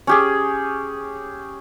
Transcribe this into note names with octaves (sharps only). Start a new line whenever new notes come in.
C#4 G4 G#4